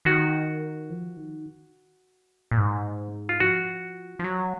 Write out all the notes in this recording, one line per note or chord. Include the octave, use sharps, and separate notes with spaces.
D#3 F#4
F3
D#3
A#2
G#2
F4
F3 F#4
F3
F#3